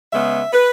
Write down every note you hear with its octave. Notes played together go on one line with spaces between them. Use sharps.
C#3 G#3 B3 E5
B4